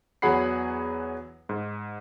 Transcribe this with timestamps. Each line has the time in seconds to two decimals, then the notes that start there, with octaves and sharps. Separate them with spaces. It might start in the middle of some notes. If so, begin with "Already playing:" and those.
0.22 E2 F#3 G#4 F#5 B5 C7
1.49 G#2